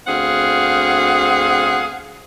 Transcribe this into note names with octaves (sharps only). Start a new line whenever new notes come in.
D2 B3 C4 G#4 F5 F#5